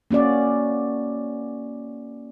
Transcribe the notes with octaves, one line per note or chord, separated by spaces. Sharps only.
A#3 C#4 F#4 D5